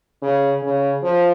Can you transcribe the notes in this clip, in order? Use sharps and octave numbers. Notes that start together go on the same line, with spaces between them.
C#3
C#3
F3